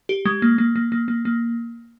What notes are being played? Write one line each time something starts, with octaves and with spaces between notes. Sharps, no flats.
G4
G#3
A#3
A#3
A#3
A#3
A#3
A#3